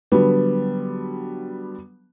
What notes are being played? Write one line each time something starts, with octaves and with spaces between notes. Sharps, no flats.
D3 F#3 G3 B3